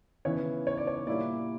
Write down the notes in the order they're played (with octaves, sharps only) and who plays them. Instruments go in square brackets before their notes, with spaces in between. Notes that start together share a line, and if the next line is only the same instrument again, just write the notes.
[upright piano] C#3 E3 B3 E4 C#5
C#5
D5
C#5
A#2 G3 A#3 E4 D5